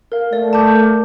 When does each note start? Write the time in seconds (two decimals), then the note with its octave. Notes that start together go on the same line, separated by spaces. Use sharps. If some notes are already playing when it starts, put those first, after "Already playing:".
0.12 A#4 F5
0.32 A3 D5
0.53 A5 D6 G6
0.74 A#4